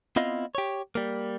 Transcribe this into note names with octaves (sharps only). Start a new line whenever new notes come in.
B3 C4 E4 F4 D#5 F5
G4 C#5
G3 A#3